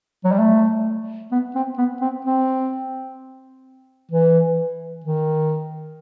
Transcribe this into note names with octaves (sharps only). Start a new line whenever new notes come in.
F#3
G3
A3
B3
C4
B3
C4
C4
E3
D#3